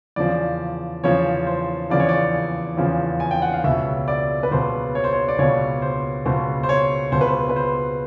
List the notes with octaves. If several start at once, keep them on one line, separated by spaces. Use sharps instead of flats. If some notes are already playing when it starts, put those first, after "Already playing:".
E2 C#3 F3 D5
E2 C#3 F3 C#5
C5
E2 C#3 F3 D5
C#5
D5
E2 C#3 F3
G#5
G5
F#5
F5
C#2 B2 E5
D5
B4
C#2 B2 C5
C#5
C5
C#5
D5
C#2 B2 C#5
C5
C#2 B2 C5
C5
C#5
C#2 B2 C5
B4
C5
B4
C5